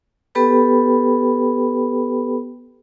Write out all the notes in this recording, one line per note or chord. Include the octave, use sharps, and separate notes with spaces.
B3 G4 A4 B4 G5 B5